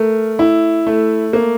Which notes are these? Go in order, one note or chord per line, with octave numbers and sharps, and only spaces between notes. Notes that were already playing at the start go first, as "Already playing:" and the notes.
Already playing: A3 A#4
E4
A3
A#3